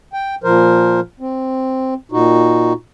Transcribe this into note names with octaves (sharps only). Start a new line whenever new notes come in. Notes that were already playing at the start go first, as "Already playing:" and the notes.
G5
A#2 F3 A#4 C5
C4
A#2 D#4 F#4